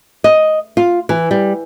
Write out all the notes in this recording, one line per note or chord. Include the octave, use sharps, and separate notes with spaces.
D#5
F4
E3
G3